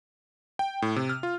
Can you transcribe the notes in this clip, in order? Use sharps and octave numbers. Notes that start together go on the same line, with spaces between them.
G5
A2
C3
F6
F4